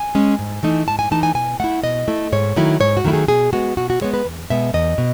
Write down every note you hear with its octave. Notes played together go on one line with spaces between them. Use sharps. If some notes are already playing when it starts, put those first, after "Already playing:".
Already playing: G#5
G#3 C#4
G#2
E3 A3 D#4
G#2 A5
G#5
E3 A3 D#4 A5
G#5
B2 G#5
A3 E4 F#5
B2 D#5
A3 E4
G#2 C#5
D#3 F#3 A3 E4
G#2 C#5
F#4
D#3 F#3 A3 E4
G#4
B2 G#4
G#3 B3 F#4
B2 F#4
F#4
G#3 B3 C#5
B4
E2
B2 G#3 B3 E5
E2 D#5
B2